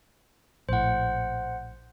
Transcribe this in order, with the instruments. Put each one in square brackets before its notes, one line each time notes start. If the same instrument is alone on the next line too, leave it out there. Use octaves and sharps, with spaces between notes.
[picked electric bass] A#1 A2 [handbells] C5 F#5